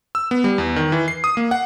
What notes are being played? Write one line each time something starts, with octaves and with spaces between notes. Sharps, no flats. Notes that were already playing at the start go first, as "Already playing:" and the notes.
E6
B3
G3
E2
D#3
E3
C7
D#6
A#3
F#5